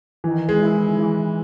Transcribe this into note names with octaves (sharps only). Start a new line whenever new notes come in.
D#3 E3
G#3
E4
E3